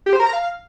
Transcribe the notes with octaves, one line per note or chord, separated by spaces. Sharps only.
G4
C5
A#4
A#5
F5